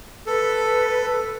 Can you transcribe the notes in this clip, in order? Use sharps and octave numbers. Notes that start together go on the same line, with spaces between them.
A4 B4